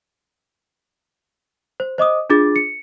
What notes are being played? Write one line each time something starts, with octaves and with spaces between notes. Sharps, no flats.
C5
C5 D#5 D6 D#6
D4 F4 G#4 D6 A6
C#7